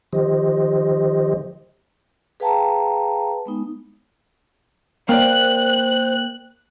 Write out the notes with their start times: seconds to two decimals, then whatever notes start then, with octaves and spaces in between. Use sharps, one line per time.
0.13 D#3 F3 G4 C5 D#5
2.40 G#4 B4 F5 G5 A5 A#5
3.46 G#3 B3 D#4
5.09 A#3 C5 D5 G5 F#6